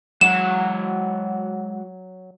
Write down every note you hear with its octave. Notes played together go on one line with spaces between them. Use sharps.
F#3 G#3 F#4 F#5 E7